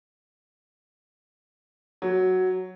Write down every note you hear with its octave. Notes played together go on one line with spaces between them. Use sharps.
F#3